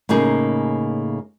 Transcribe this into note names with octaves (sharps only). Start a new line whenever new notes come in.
A2 C#3 A#3 D#4 G#4